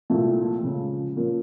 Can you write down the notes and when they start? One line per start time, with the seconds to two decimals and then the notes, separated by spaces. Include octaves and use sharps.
0.10 C2 A#2 F3 A3
0.63 C#2 C#3 F3
1.16 A#2 F3 A#3 C#4